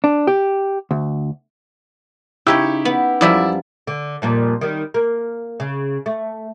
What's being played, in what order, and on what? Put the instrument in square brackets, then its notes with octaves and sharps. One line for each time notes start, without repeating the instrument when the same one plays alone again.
[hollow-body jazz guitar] D4
G4
D2
[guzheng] C#3 D#4 C#5 [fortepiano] E4 G4 E6
[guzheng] B3
[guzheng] F#2 F3 G3 [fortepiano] E4 D5 E5
[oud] D3
F2 A#2 G3
D#3 G3
A#3
C#3
A3